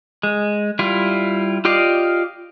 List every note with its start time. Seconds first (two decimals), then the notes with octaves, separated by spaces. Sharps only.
0.23 G#3
0.79 G3 E4 F4
1.65 F4 G4 D5 D#5 F5